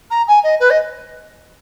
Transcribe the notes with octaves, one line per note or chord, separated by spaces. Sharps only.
A#5
G#5
D#5
B4
D#5